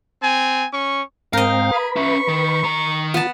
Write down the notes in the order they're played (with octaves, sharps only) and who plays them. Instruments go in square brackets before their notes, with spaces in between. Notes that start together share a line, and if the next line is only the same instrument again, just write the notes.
[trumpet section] C4 G#5
C#4 C#6
[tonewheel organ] G#2 C4 G5 [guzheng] A#4 D#5 [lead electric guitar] F5
[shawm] G#4 [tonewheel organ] B4 B5
[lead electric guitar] C#4 E5 [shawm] C#6
[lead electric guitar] D#3
D#3 A#5
[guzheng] B3 A5 [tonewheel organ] F4